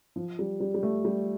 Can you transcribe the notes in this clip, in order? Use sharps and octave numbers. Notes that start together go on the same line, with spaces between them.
F3
G3
G3
G3
A3
G3